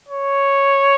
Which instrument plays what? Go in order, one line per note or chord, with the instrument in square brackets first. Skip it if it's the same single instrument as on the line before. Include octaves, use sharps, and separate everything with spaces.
[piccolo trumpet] C#5